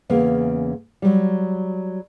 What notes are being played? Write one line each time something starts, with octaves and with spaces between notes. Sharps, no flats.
E2 C#3 A#3
F#3 G3